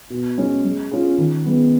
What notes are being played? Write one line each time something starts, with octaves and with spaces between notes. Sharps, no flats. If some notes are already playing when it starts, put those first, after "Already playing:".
B2
G#3 C#4 G#4
G#3
C#4 F4 G#4
D#3
G#3 B3